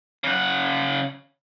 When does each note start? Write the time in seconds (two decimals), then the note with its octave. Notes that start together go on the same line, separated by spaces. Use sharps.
0.24 C#3 F#5